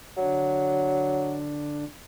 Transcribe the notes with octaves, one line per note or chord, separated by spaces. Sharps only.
D3 F#3 D4